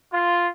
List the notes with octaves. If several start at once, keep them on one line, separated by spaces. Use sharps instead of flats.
F4